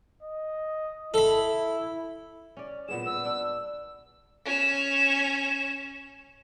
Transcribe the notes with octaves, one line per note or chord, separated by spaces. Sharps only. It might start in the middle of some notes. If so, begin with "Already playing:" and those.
D#5
E4 A4 B5
C#4 D5
A#2 B3 G#4 E7
B3 E6
D4
C#4 E7